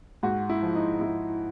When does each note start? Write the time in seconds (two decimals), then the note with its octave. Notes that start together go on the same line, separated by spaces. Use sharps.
0.23 G#2 F#4
0.50 E4
0.62 F3
0.75 D#4
1.01 G#2 E4